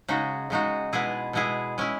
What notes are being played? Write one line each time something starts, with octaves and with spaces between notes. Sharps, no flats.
C#3 G#3 D#4 F#4
C#3 G#3 D#4 F#4
B2 G#3 B3 E4 G#4
B2 G#3 B3 E4 G#4
G#3 C#4 E4